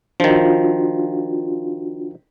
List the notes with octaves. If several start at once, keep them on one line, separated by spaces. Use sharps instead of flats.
D#3 F3 D4 F4 F#4